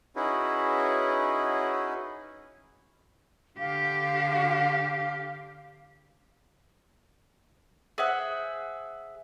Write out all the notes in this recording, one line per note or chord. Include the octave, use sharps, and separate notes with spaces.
C#4 D#4 E4 F#4 G#4 B4
D3 G4 F5
G#4 C5 E5 F#5